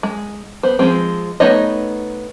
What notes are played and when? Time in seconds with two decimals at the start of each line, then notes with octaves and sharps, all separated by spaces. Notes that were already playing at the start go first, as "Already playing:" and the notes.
0.03 G#3
0.63 B3 C5
0.79 F3 G3 G#3 C4
1.40 A3 B3 D#4 C#5 D#5